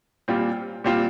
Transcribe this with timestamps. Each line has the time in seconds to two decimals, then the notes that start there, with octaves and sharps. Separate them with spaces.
0.28 A#2 G3 C4 F4
0.84 A#2 G3 C4 F4